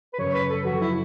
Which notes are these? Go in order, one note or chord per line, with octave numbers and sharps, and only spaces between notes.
B4
F#2 C#3 F#3 C#5
B4
A4
F#2 C#3 F#3 F#4
E4